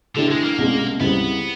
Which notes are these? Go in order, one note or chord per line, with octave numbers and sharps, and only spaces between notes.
D3 E3 A3 D4 G4
G#3
A#3
C2 B2 G#3 C#4
C#2 C#3 E3 G3 B3 C4